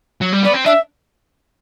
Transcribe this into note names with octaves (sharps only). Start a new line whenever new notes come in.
F#3
G3
B3 D5
C4
D4 E5